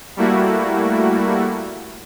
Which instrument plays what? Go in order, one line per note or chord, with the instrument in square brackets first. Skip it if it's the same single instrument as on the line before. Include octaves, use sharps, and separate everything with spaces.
[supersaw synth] G3 A3 A#3 E4 F#4